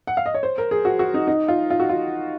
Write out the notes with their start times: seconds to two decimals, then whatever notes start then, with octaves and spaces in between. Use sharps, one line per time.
0.07 F#5
0.17 F5
0.26 D#5
0.34 C#5
0.43 C5
0.58 A#4
0.71 G#4
0.85 F#4
0.99 F#4
1.14 D#4
1.27 D#4
1.48 F4
1.70 F4
1.80 F#4
1.89 F4